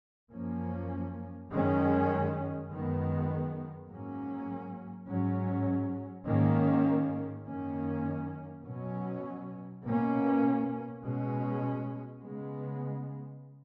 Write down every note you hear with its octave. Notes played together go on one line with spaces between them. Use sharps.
F#2 F3 A#3 C#4
F#2 D#3 G#3 C#4
F#2 D#3 G#3 B3
G#2 F#3 A#3 C#4
G#2 F#3 C#4
G#2 D#3 A#3 C#4
F#2 D#3 A#3 C#4
B2 F#3 C#4
B2 A#3 C#4
B2 G#3 C#4
C#3 G#3 B3